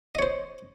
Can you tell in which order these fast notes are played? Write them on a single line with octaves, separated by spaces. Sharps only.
D#5 C#5 C5